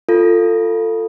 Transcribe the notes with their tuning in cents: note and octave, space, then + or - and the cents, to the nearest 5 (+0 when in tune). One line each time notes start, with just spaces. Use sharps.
F4 +0 A4 +20